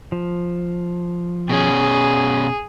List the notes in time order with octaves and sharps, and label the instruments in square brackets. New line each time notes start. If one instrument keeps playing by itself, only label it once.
[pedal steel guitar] F3
[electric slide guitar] B2 C#4 [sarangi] G#4